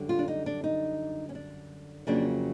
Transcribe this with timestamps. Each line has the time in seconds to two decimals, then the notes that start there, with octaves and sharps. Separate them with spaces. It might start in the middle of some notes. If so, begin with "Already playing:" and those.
Already playing: F#2 D3 G3
0.09 F4
0.19 D4
0.28 D#4
0.46 D4
0.64 D#4
1.29 C#4
1.35 D4
2.07 F2 C#3 F#3 A#3 D4